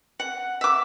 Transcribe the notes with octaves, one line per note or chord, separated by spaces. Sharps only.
F#5
E5 D6